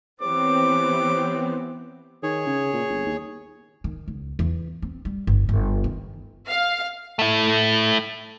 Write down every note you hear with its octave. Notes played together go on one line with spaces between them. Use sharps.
E3 B3 C4 G4 C5 C#5 D6
D#3 G#4 C#5
C#3
A#2
G1
D#2
D#3
C#2
E2
C4
G3
G1
G1
D#3
F5
A3 E4